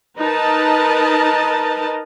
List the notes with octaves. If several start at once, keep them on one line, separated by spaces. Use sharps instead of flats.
D#4 A#4 B4 D#5 A5